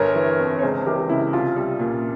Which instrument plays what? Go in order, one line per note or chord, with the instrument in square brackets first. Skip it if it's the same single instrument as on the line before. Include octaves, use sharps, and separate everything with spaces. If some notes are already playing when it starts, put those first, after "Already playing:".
Already playing: [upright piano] G1 A#4 C#5
E3
F2
C#5
C#2 G#4 C5
E3 G4 A#4
C#3 E4
C2 F4
G3
A#2